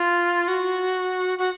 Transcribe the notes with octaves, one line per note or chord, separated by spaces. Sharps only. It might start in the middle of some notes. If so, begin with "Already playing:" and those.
Already playing: F4
F#4
F#4